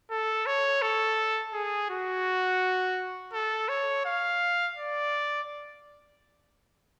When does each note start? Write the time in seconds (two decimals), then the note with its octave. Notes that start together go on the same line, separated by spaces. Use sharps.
0.11 A4
0.46 C#5
0.82 A4
1.53 G#4
1.90 F#4
3.33 A4
3.69 C#5
4.05 F5
4.77 D5